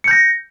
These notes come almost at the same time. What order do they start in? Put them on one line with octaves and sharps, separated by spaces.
C#7 G6 A#6